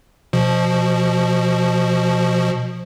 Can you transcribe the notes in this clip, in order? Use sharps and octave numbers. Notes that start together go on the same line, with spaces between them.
B2 F3